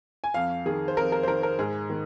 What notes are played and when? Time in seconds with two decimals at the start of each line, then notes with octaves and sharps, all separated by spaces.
0.24 G#5
0.34 F2 F5
0.66 D#3 G#4
0.88 C5
0.97 F2 A#4
1.12 A#4
1.23 C5
1.28 D#3 A#4
1.43 A#4
1.59 G#2 G#4
1.90 D#3